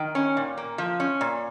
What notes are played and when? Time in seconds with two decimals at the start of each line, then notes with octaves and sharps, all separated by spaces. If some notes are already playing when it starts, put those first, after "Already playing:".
Already playing: D#3
0.15 C#4
0.37 A#2
0.58 A#3
0.78 F3
1.00 C#4
1.21 A#2